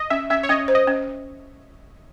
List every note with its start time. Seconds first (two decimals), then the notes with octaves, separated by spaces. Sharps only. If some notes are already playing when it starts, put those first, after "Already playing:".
Already playing: D#5
0.10 C#4 E5
0.30 C#4 E5
0.43 C#5
0.49 C#4 D#5
0.68 C5
0.75 D#5
0.87 C#4